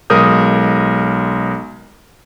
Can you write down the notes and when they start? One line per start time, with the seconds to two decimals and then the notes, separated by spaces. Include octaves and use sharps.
0.10 B1 G#3 A#4 D#6 G6